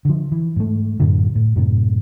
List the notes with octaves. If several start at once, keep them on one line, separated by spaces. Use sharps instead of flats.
D3 F3
E3
G#2 A3
F#2 A2 D3
A2
F#2 A2 C3